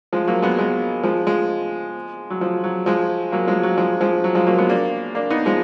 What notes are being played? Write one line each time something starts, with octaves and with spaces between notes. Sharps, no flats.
F3 G#3
F#3 A#3
G#3 B3
G#3 B3
F3 G#3
F3 G#3
F#3
F3
F#3
F3 G#3
F#3 A#3
F3 G#3
F#3
F3 G#3
F3 G#3
F#3
F3 G#3
F#3 A#3
G#3 B3
A#3 D4
A#3 D4
B3 D#4
F3 G#3